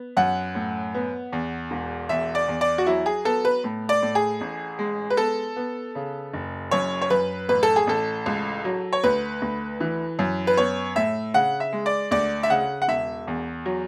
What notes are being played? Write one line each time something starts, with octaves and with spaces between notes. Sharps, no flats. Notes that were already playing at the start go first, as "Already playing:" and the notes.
Already playing: B3
F#2 F#5
A2
B3
E2
E1
E2 E5
D5
E2
D5
F#4
F#3 E4
G#4
B3 A4
B4
A2
D5
A2
G#4
A1
G#3
B4
B3 A4
B3
C#3
F#1
F#2 C#5
C#5
F#2 B4
A1 B4
A4
G#4
A1 A4
C#2
F#3
C#5
D2 B4
D2
E3
F#2
B4
B3 C#5
A2 E5
C#3 F#5
E5
G#3
D5
D2 D5
E5
C#3 F#5
F#5
E1 E5
E2
F#3